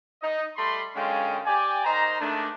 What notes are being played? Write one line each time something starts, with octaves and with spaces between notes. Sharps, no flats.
D#4 D#5
G3 A3 B5 C6
F#2 D3 G#3 C#4 F5 G5
G4 D5 G5 G#5
D#3 C5 D#5 A#5
G#2 D#3 A3 D4